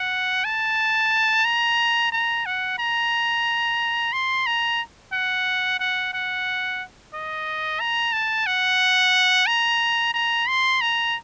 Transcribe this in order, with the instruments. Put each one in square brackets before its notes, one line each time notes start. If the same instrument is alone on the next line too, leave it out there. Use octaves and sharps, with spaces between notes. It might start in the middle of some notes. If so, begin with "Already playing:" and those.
Already playing: [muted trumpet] F#5
A5
A#5
A#5
F#5
A#5
C6
A#5
F#5
F#5
F#5
D#5
A#5
A5
F#5
A#5
A#5
C6
A#5